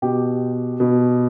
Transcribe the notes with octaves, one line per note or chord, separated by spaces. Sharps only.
B2 G4
B2